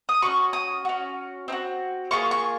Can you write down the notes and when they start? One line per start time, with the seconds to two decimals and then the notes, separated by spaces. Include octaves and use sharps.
0.09 D#6
0.22 C#4 F#4 C#6
0.53 D#6
0.85 C#4 F#4
1.48 C4 D#4
1.52 F#4
2.11 A#3 F4 G#4 C#6
2.31 C#6